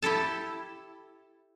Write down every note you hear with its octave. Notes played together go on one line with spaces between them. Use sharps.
E4 G4 A4 A5